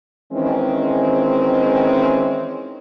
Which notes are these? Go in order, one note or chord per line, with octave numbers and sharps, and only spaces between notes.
D#3 E3 G#3 C4 C#4